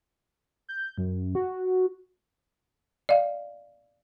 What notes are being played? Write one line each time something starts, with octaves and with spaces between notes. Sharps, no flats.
G6
F#2
F#4
D5 D#5 F5